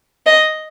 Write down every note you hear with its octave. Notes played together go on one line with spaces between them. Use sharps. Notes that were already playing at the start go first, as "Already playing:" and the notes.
D#5